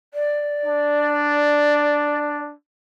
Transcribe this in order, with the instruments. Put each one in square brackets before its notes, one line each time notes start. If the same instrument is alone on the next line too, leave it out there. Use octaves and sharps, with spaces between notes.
[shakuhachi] D5
[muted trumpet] D4